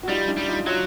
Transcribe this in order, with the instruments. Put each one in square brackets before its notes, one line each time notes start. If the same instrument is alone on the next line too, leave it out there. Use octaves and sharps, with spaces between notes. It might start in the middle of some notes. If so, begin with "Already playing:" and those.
[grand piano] F#4
[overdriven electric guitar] G3 [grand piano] D#4 F4
[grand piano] D4 E4
[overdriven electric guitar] G3
[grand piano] D#4 F4
[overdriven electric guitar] F#3 [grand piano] D#4 F4